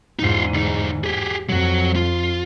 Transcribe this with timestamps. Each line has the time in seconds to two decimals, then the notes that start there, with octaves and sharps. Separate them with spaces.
0.19 E2 G#2 D#4 F4
0.54 D2 D#4
1.04 G4 G#4
1.49 F2 F#3 F#4
1.96 F4